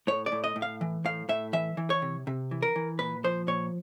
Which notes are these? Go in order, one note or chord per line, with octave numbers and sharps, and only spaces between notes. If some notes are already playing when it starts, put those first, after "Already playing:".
A2 C#5
D5
A2
D#5
A2
F5
E3
A2 F5
A2 E5
E3 E5
E3
C#5
C3
C3
E3
A#4
E3
A#2 B4
F3 C5
A#2 C#5